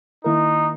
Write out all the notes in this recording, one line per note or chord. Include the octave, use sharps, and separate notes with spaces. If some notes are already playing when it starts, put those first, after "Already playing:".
D#3 A#3 D#4 E4 A#4